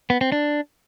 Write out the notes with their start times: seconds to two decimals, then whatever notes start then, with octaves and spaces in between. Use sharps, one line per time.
0.10 B3
0.21 C4
0.32 D4